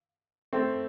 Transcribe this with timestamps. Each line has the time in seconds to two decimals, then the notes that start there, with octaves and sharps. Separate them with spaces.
0.53 A3 C4